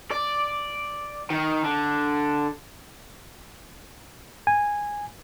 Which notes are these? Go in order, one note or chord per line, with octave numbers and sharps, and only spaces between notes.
D5
D#3
D3
G#5